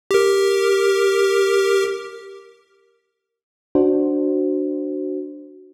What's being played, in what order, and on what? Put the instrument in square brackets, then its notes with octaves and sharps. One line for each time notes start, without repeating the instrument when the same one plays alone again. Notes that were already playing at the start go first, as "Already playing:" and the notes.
[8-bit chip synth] G4 A#4
[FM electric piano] D4 F#4 C5